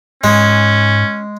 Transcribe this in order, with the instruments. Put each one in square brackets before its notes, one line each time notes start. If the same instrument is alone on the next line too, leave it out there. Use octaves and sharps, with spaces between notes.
[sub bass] G#2 [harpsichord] G#3 [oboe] C#4